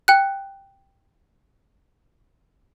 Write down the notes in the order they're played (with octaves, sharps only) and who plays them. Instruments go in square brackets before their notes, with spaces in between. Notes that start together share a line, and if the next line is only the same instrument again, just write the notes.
[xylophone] G5 F#6